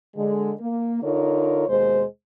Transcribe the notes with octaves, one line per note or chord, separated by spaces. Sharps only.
D3 G#3
A#3
D3 D#4 F4 A#4 C#5
D#2 B2 G#3 C5